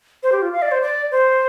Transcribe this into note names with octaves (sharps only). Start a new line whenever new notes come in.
C5
G4
F4
F5
D5
C5
D5
C5